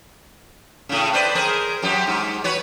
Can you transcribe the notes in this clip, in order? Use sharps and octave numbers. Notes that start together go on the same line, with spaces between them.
A2 C#3
B4 C5 D5
G#4 A#4 C5
F#2 F#3 G4
G#2
F#4 B4 C#5